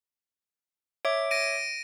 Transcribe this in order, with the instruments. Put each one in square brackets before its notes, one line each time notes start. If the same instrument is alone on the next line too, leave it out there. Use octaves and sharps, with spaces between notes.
[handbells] C#5 E5 D6 [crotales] D7
[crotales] A#6 D7 D#7